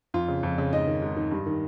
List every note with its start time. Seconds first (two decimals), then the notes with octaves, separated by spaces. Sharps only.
0.14 F2 F4
0.29 C#3
0.43 F2
0.58 C#3
0.73 G#2 D#5
0.87 D#3
1.02 G#2
1.17 D#3
1.31 G2
1.47 D#3